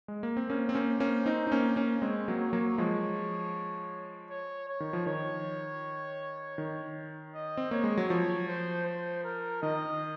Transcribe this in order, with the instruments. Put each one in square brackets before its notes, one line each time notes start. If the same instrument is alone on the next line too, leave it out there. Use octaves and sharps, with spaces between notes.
[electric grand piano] G#3
A#3
C4
[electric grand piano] A#3 C#4 [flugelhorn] C5
[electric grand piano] C4
A#3 C#4
A#3 C#4
C4 D#4
D#4
A#3 C#4
A#3 C#4
[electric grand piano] G#3 C4 [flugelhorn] C#5
[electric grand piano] F#3 A#3
[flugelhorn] C#5
[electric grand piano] F#3 A#3
[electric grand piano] F3 G#3 [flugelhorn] C#5
[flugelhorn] C#5
C#5
[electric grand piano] D#3
F3
[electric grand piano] D#3 [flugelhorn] C#5
[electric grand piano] D#3
[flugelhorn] D#5
[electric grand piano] C4
[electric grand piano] A#3 [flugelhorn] C#5
[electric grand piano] G#3
F#3
[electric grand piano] F3 [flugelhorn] C#5
[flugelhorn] C5
C5
A#4
[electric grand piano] D#3 [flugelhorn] D#5